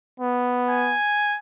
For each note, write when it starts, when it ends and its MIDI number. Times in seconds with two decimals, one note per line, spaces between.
0.20 0.97 59
0.69 1.38 80